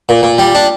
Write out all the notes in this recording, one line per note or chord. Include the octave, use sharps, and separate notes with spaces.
A#2
A#2
G3
D4